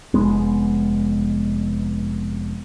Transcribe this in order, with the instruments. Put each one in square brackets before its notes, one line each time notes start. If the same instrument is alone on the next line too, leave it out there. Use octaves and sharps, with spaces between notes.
[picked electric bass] F1 F#2 G#3 B3